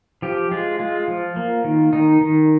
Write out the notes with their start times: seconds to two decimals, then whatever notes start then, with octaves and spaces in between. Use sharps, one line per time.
0.22 F3 G4
0.52 G#3 F4
0.79 G#3 F4
1.08 F3
1.36 A#3
1.64 D#3
1.93 D#3 D#4
2.21 D#3